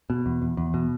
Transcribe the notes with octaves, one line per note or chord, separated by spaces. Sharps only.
B2
E2
E2
E2
B2